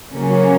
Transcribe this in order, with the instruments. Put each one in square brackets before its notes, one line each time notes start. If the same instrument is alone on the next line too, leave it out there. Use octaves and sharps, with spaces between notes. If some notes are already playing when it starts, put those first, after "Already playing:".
[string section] C#3 F#3 A#3 C#4 [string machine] F#4